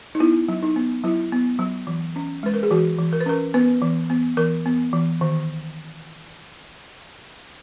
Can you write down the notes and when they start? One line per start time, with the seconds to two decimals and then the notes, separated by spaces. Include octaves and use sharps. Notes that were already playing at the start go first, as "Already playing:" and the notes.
0.15 D#4
0.20 B3 E4
0.48 F#3
0.63 D#4
0.76 B3
1.04 F#3 E4
1.32 B3
1.59 F#3
1.87 E3
2.16 C#4
2.43 G#3 B4
2.54 A#4
2.63 G#4
2.71 E3 F#4
2.99 E3
3.13 A#4
3.21 B4
3.26 C#4 A#4
3.54 B3 B4
3.82 E3
4.10 B3
4.37 E3 A#4
4.66 B3
4.93 E3
5.21 D#3